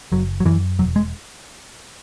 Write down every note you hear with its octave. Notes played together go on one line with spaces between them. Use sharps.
F#1 F#3
F#3
F#2 E3
E1 F#3
G#3